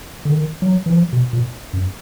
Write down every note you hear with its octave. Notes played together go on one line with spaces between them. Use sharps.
D3
D#3
F#3
E3
F3
B2
A#2
F#2